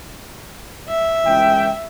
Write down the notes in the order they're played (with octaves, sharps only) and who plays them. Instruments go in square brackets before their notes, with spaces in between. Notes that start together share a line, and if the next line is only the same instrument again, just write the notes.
[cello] E5
[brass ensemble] C#2 E3 G5